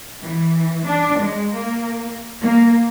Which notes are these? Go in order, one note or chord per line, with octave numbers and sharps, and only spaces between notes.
E3
D4
G#3
A#3
A#3